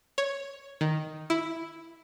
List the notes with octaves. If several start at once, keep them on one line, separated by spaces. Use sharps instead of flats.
C#5
D#3
E4